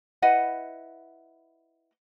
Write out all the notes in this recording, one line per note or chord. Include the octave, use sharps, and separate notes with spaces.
E4 B4 D#5 F#5